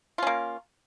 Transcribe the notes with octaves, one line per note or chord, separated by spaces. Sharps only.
A#3 C#4 F4